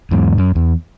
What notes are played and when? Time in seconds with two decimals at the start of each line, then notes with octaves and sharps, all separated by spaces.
0.11 E2 G#2
0.38 F#2
0.55 E2